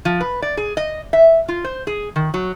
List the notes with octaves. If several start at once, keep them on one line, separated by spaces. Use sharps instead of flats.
F3
B4
D5
G#4
D#5
E5
F4
C5
G#4
D#3
F#3